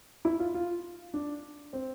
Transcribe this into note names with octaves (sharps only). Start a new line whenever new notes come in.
E4
F4
F4
D4
C4